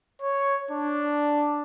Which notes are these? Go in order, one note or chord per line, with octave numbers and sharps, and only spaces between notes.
C#5
D4